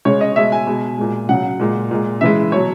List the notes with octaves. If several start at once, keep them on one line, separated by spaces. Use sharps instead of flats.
C#3 G#3 C#5
D#5
B2 G#3 E5
G#5
B2 G#3
A#2 G#3
C#3 F#3 F#5
A#2 G#3
A#2 G#3
C#3 E3 G#3 E5
B2 F#3 C#5